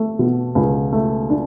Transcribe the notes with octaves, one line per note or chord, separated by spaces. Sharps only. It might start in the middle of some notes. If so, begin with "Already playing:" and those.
Already playing: A3
B2
C#2
A3
D4